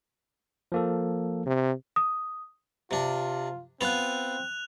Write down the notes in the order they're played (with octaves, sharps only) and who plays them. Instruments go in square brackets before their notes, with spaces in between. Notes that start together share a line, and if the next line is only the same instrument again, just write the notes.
[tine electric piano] F3 A#3 A4
[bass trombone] C3
[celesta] D#6
[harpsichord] C3 D4 [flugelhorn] F4
[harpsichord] B3 F4 [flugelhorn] C4 [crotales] F#6 F7